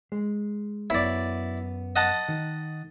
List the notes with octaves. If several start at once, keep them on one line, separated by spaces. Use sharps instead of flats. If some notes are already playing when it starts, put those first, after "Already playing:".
G#3
F#2 B3 E4 C#5 D5
D#5 F#5 A5
D#3